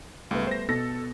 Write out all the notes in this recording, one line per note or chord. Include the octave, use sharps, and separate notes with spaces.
C#2 G3 A3 B3
C5 A#6
B2 A4 A#6